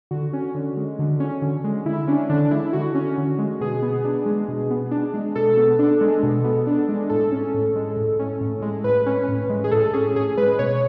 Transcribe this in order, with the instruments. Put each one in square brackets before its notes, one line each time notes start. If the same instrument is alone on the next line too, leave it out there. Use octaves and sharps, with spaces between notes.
[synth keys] D3 F#4
C#4
D3
G#3
D3
C#4
D3
G#3
D3 E4
C#4 D4
D3 D4
G#3 E4
D3 F#4
C#4
D3
G#3
B2 G#4
B3
D4
G#3
B2
B3
D4
G#3
B2 A4
B3
D4
G#3
B2
B3
D4
G#3
A2 A4
C#4
A2
G#3
A2
C#4
A2
G#3
A2 B4
C#4
A2
G#3
G#4
A2 A4
C#4 G#4
A2 G#4
G#3 B4
B2 C#5